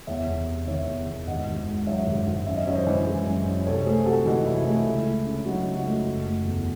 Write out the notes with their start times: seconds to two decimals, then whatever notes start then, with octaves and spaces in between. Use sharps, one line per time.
0.07 E2 C#5 E5
0.27 E2
0.48 C3
0.67 D#3 C#5 E5
0.88 E2
1.07 E2
1.27 G#1 D#5 F#5
1.47 G#1
1.67 G#2
1.87 F#3 C#5 E5
2.07 G#1
2.27 G#1
2.47 F#2 E5
2.56 D#5
2.66 F#2 C#5
2.75 C5 D#5
2.87 E3
3.06 G#3
3.27 F#2
3.46 F#2
3.66 C2 A4 C#5
3.86 A3 G#4 C5
4.06 C3 F#4 A4
4.26 E3 D#4 F#4
4.46 C2 E4
4.66 A3 E4 G#4
4.86 C#2 E4 G#4
5.05 A3
5.26 C#3
5.45 F#3 D#4 F#4
5.66 C#2
5.75 D#4 F#4
5.85 A3
6.05 F#1
6.25 A3
6.45 E2